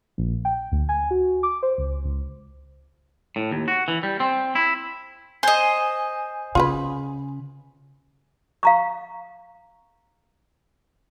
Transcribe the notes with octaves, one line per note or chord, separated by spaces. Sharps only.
A#1
G5
D2
G#5
F#4
D6
C5
C#2
C#2
A2
D#2
F#4
E3
G3
C4
E4
C5 D#5 G#5
C#3 F4 G#4 B4
F5 A#5 C#6